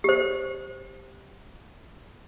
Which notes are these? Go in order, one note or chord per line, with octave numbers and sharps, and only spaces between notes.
G4 C5